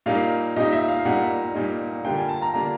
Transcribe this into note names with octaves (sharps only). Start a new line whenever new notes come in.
A#2 G3 A#3 D#4 F5
A#2 G3 A#3 D#4 D#5
E5
F5
A#2 G3 A#3 D#4 F#5
A#2 G3 A#3 D#4
D3 G3 A#3 D4 F4 G5
G#5
A5
A#5
D3 G3 A#3 D4 F4 A#5